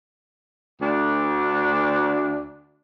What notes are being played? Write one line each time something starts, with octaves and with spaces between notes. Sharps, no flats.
D2 D4